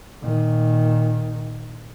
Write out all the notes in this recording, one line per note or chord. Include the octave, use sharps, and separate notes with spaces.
A#2 D#3